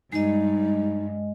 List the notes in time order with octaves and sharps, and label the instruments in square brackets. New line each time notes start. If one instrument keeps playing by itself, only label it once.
[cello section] G2 [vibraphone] G#3 D#5 [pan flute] D#4